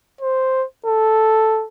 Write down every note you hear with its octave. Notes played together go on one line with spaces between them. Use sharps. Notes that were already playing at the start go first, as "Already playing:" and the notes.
C5
A4